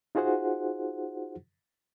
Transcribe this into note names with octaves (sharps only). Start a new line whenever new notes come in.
D#4 F4 F#4 G#4 C5 F#5